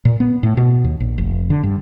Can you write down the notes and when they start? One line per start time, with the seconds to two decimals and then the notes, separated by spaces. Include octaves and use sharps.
0.05 A#2
0.20 B3
0.43 A2
0.57 B2
0.84 D#2
1.00 A#1
1.18 F1
1.50 D3
1.63 G2